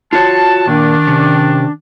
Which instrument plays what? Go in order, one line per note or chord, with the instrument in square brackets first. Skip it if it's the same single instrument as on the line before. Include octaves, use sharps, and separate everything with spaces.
[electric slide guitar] F4 F#4 C#5 [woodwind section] A5
[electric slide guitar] A#2 [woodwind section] D#3 D4
[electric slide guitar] C3 C#4